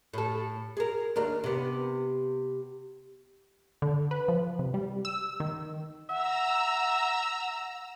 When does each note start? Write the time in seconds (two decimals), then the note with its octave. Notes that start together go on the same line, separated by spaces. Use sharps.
0.13 A2 A4
0.77 G#4 A#4
1.16 D#2 D4 A#4
1.44 C3 B3
3.82 D3
4.11 B4
4.28 F3
4.59 C3
4.74 G3
5.05 E6
5.40 D#3
6.09 E5 F#5 A#5 E6